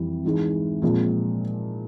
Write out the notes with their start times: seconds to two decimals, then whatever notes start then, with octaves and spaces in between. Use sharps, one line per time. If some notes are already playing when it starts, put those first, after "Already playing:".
Already playing: F2 E3 G3
0.25 G#2 E3 G#3
0.82 A#2 F3 G#3 C4